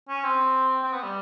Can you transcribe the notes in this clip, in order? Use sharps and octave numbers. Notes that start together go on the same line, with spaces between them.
C#4
C4
C4
B3
G3